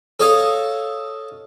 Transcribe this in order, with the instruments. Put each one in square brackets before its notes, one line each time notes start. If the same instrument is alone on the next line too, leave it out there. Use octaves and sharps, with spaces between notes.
[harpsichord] A4 C#5 D#5 F5 A5